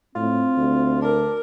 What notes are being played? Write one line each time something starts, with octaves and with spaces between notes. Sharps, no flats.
A2 C4 F4
D2
D4 A#4